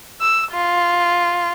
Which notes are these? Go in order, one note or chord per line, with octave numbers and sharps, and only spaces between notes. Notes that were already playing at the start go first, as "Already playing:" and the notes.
E6
F4